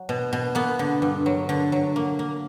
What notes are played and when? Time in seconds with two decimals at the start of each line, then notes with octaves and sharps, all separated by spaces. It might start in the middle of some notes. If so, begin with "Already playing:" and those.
Already playing: F#3
0.09 B2
0.33 B2
0.55 A#3 B3
0.79 D3
1.02 G2
1.26 F#3
1.49 D3
1.72 F#3
1.96 A#3
2.19 A#3